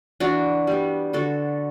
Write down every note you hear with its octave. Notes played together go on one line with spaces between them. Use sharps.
E3 D4 F#4
G3 B3
D3 F#4 A4